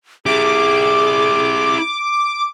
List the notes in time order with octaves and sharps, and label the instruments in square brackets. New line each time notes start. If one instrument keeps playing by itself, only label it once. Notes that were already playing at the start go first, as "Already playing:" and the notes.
[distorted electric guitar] E4 G4 [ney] G#4 [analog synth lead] D6